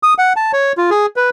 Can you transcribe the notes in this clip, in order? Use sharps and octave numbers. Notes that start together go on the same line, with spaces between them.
D#6
F#5
A5
C#5
F4
G#4
B4